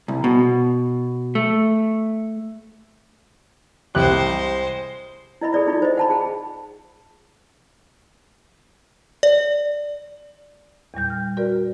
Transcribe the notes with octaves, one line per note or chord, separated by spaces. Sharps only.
C2
B2
A3
C2 G#3 G4 C5 F#6
E4 D#5 E5 B5
G#4 A4 D5 E5
D#4 F4 B5
C5 D#5
F#5 A5 B5
G#4 F#5 A5
D5
E2 A#2 G3 G6
F6
F#4 A#4 B4 D5